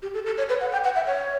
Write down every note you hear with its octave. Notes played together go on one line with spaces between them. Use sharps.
G4
A4
A4
C#5
B4
F#5
G5
F#5
E5
C#5